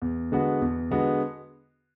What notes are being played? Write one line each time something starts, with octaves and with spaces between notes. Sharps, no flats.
E2
D3 G#3 B3 F#4
E2
D3 G#3 B3 F#4